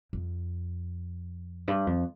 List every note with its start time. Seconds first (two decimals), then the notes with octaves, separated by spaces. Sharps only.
0.13 F2
1.68 G2
1.87 F2